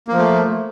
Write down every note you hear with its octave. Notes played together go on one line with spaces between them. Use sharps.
F3 A3 A#3